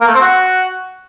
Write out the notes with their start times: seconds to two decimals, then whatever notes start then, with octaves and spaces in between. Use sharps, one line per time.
0.01 A#3
0.07 A3
0.14 C4
0.21 F#4